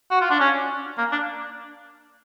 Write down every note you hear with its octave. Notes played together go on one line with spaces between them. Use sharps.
F#4
F4
D4
C#4
A#3
D4